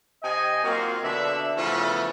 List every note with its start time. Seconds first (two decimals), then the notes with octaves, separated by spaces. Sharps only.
0.23 C3 D#5 G5 G#5
0.64 F#3 A#3 C4 D#4 F4 F#4
1.03 B2 D3 D4 E5
1.56 C#3 E3 F3 A3 B3 C#4